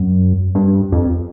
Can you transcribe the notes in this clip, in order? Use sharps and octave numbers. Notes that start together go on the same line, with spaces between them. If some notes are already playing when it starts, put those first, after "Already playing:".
Already playing: F#2
G2
F2